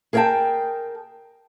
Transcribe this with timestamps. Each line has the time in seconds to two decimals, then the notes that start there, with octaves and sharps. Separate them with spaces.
0.13 G#4 A#4 C#5 E5 G5 A5